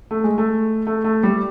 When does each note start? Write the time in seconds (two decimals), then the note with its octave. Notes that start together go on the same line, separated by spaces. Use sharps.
0.11 A3
0.24 G#3
0.38 A3
0.87 A3
1.04 A3
1.23 G3